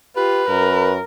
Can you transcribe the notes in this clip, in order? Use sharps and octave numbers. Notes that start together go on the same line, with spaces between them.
F4 G4 B4
F#2 A#4